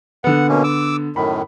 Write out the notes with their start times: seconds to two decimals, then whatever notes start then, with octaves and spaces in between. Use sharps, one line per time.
0.24 D3 B3 F#5
0.49 B2 A#3 C#4
0.64 D6 E6
1.16 F#2 A2 D#3 B5